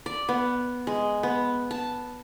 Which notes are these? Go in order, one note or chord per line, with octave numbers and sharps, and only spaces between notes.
D5
B3
G#3
B3
A5